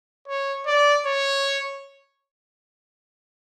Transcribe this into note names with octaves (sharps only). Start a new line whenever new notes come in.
C#5
D5
C#5